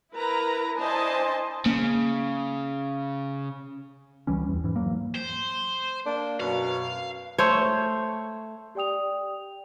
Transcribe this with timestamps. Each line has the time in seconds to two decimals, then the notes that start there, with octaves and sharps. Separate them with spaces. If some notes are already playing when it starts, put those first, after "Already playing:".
0.14 E4 A#4 B4 A#5
0.78 D4 E4 C5 D#5 G#5 A5
1.66 C#3 A#3
4.27 C#2 E3 G3 C#4
4.49 E2
4.64 G#2 E3
4.76 F#3 A#3
5.15 C5
6.06 A#3 D4
6.40 F#2 B2 F5
7.38 A3 C5 C#5
8.75 G4 D5 G5 D#6 F7